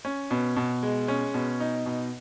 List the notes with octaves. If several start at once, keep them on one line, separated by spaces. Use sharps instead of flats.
C#4
B2
B2
G#3
C#4
B2
D#4
B2